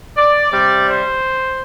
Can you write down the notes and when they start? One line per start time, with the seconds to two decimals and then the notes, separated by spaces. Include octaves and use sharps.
0.17 D5
0.51 C3 G3 D5
0.87 C5